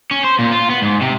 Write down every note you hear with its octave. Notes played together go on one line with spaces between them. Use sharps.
C#4
C5
A#2
F4
B3
G#2
C3